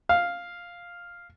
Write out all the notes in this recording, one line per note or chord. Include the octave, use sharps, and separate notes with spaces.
F5